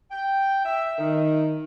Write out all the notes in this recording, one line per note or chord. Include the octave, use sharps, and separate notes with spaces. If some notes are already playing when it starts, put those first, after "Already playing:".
G5
E5
D#3